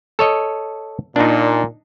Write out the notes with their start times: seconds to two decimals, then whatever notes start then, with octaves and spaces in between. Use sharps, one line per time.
0.19 A4 C#5 D#5
1.16 A#2 D4 D#4